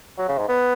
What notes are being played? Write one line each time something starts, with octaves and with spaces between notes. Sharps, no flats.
F#3
C#3
G#2
B3